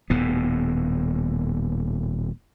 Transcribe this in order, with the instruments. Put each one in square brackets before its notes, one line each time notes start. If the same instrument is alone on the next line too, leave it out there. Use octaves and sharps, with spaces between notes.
[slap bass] D#1 D#2 A2 B3